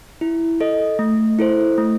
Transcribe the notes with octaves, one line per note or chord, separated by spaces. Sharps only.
E4
A4 D#5
A3
E4 A4 C5
A3